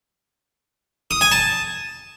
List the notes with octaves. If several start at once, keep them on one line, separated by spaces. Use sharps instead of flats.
D#6
G#5
A5